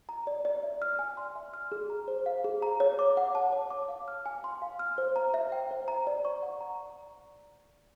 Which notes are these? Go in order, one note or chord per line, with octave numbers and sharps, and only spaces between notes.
A#5
D5
D5
E5
F6
G#5
C6
E5
F6
G#4
A#5
C5
F5
G#4
A#5
C#5
D6
F#5
A5
C#5
D6
F5
F6
G#5
C6
F5
F6
C5
A#5
E5
G5
C5
A#5
D5
C#6
F#5
A#5